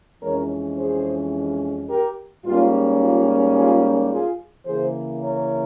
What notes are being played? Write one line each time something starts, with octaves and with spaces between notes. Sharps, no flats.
F2 E3 G#3 C#4 A#4 C#5
G#4 C5
G4 A#4
G#2 G3 A#3 C#4 F4
F4
F4 G#4
F4 G#4
C#3 E3 A#3 G#4 C5
A#4 C#5